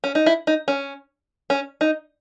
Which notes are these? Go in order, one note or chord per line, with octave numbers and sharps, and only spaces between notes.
C#4
D#4
E4
D#4
C#4
C#4
D#4